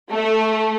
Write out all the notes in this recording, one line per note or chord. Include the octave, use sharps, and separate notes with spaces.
A3